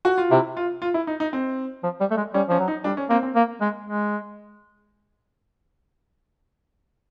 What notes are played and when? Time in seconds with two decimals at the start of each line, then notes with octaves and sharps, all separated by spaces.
0.05 F#4
0.18 F4
0.31 C3 E4
0.57 F4
0.82 F4
0.94 E4
1.07 D#4
1.20 D#4
1.33 C4
1.83 F3
2.01 G3
2.11 A3
2.17 G#3
2.34 G3 C#4
2.49 F3 C#4
2.59 F#3
2.68 D#4
2.84 G3 D4
2.97 C#4
3.10 A#3 C4
3.23 C4
3.35 A#3
3.61 G#3
3.86 G#3